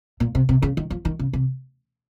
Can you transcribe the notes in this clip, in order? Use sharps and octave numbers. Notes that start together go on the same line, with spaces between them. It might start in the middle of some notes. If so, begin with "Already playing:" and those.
A#2
C3
C3
C#3
D#3
F3
D#3
C#3
C3